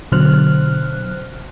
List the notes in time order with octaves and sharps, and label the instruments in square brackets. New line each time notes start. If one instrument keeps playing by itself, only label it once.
[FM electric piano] B2 D3 F#3 C5 F6 F#6